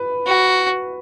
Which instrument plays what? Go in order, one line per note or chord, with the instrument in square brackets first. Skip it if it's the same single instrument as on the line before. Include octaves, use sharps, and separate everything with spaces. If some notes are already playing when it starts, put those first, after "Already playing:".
Already playing: [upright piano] B4
[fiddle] F#4